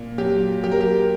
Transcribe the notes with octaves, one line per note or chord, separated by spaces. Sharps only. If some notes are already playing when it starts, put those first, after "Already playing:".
Already playing: A#2
F#3 G4
F#3 G4
A#4
G4